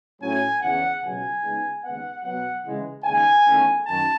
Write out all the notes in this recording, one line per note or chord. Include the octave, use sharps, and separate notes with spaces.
A2 F#3 C#4 G#5
E2 C#3 E3 F#5
C#2 B2 F#3 G#5
C#2 C#3 G#3 B3 D#4
D#2 C#3 G#3 B3 F#5
B2 F#3 B3 F#5
C#3 E3 G#3
D#2 C#3 G#3 D#4 G#5
E2 D#3 A3 C#4
F#2 D#3 A5